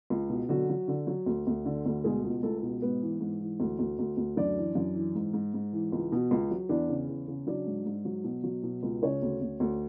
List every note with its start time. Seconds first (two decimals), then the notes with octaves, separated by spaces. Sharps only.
0.10 C#2
0.29 B2
0.49 D3 F#3 F#4
0.69 F#3
0.88 D3
1.07 F#3
1.26 D2
1.47 D2
1.65 D3
1.86 D2
2.04 B2 G#3 G#4
2.24 C#2
2.43 C#2 A3 A4
2.63 B2
2.82 G#2 B3 B4
3.01 E3
3.21 G#2
3.40 E3
3.60 D2
3.79 D2
3.99 D2
4.17 D2
4.36 F#2 D4 D5
4.57 E3
4.75 F#2
4.95 E3
5.15 G#2
5.33 G#2
5.54 G#2
5.73 E3
5.92 C#2
6.12 B2
6.31 C#2
6.51 F#3
6.69 E2 D4 D5
6.89 C#3
7.08 E2
7.28 C#3
7.47 F#3 D4 D5
7.67 G#2
7.86 G#2
8.05 F#3
8.24 B2
8.44 F#3
8.63 B2
8.83 C#2
9.02 C#3 C#4 C#5
9.22 D2
9.41 D2
9.60 D2